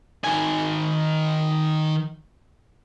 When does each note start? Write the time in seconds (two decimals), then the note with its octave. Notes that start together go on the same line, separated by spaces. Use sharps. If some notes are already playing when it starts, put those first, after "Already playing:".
0.24 D#3 G#5